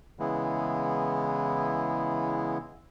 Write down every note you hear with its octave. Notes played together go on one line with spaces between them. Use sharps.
C#3 E3 G#3 B3 E4